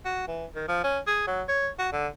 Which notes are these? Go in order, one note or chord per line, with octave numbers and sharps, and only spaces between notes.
F#4
E3
D#3
F3
C#4
G#4
F#3
C#5
F#4
D3